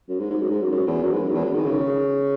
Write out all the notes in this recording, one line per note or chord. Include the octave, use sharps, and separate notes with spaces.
F#2
G#2
G#2
F#2
G#2
F#2
F#2
E2
F#2
G#2
F#2
E2
F#2
D#3
C#3